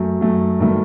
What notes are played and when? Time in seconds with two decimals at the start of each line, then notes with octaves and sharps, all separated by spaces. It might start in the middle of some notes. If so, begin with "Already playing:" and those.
Already playing: F#2 F#3 A3
0.21 F#2 F#3 A3
0.59 G2 D#3 F#3 A3